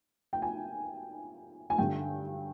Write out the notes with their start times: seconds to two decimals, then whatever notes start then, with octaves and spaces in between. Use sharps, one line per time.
0.33 G5
0.42 G#5
1.70 G#5
1.78 G2 D3 G5